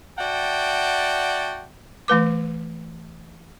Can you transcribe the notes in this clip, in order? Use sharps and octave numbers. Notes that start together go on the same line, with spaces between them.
F#4 D5 E5 F#5 G5 A5
E3 A3 B4 D6